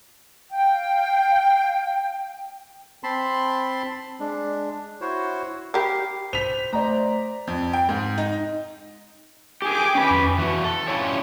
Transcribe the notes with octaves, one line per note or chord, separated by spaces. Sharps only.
F5 G5
C4 A5 B5 C6
G#3 D4
E4 F#4 C5 C#5
G4 A#4 B5 D6 C7
C5 B6 F7
A3 C5 D5 A#5
F2
G5
G#2
D#4
G4 G#4 G5 G#5 D6
C#4 B4
F2
E3 F#4
A4
C#4 D4 E4 F4 G4 C#5